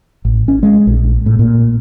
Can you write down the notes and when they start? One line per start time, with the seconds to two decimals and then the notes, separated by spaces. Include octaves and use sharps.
0.25 A1
0.48 C#4
0.63 G#3
0.87 A#1
1.26 A2
1.39 A#2